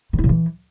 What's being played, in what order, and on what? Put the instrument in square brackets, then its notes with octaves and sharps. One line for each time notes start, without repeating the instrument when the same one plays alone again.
[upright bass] D#3
E4
C#3
E3